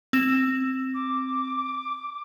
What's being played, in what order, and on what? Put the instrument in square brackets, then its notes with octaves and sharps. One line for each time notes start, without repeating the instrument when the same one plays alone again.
[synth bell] C4 E7
[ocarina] D6